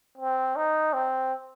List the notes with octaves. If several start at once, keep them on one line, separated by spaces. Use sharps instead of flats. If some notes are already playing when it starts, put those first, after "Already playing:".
C4
D#4
C4